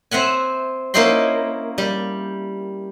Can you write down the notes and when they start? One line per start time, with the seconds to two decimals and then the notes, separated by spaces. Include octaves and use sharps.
0.11 C4 E5 F#5 G#5
0.94 A#3 C#4 E4 D#5 G5 C6
1.78 G3